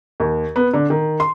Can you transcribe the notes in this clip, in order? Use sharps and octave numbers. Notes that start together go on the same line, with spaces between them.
D#2
B3
D3
D#3
C6